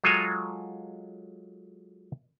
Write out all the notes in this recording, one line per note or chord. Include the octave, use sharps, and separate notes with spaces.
F#3 G#3 F4 A4 G#5 A#5